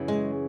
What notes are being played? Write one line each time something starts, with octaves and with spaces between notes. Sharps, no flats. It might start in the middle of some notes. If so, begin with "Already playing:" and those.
Already playing: F#2 C#3 E3
G#3